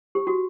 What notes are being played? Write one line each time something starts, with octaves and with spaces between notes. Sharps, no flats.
G4
F#4